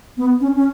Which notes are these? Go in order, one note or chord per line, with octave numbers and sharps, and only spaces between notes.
B3
C#4
C#4